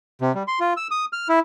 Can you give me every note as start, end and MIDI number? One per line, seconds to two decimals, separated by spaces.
0.22 0.32 48
0.35 0.43 55
0.48 0.59 84
0.60 0.73 65
0.77 0.88 88
0.91 1.05 87
1.13 1.28 89
1.29 1.39 64